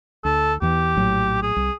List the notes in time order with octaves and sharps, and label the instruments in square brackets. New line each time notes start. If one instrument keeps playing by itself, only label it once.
[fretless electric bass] D2 [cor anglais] A4
[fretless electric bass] E2 E3 [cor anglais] G4
[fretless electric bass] A#1 A2 F#3
[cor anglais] G#4
[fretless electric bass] C2